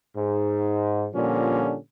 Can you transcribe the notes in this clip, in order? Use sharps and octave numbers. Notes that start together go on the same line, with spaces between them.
G#2
A#2 D3 F3 G3 C#4